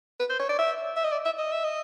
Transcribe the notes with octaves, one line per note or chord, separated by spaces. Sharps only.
B4
C5
C#5
D5
E5
E5
D#5
D5
E5
D#5
E5
D#5